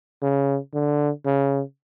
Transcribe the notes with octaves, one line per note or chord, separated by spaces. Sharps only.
C#3
D3
C#3